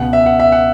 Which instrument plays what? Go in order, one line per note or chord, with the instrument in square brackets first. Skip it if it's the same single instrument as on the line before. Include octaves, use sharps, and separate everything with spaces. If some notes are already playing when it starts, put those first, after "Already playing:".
Already playing: [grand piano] C#2 B2 F#5
E5
F#5
E5
F#5